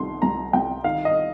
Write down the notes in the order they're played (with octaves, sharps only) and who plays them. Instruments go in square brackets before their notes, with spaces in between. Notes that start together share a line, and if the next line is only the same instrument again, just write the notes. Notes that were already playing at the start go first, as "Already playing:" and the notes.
Already playing: [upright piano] C2 D#3 C6
C2 A#5
C2 G5
D#3 F5
D#5